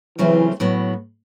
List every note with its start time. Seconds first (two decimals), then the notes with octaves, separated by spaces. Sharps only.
0.19 C#3 E3 F#3 A3 C4 F4
0.60 A2 F#3 B3